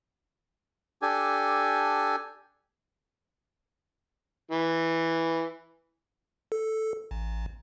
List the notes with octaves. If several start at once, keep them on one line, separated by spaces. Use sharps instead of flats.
D4 G4 A4 G#5
E3
A4
A1